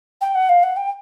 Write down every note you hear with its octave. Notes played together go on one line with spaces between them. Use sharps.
G5
F#5
F5
F#5
G5